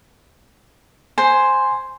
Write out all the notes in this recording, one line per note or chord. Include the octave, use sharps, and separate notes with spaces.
C5 G#5